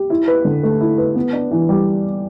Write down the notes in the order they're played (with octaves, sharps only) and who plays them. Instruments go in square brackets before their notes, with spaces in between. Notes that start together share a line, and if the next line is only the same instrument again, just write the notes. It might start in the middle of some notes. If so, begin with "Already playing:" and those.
Already playing: [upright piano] G4
E4
B4
D3
A3
E4
B4
B3
D4
E3
G3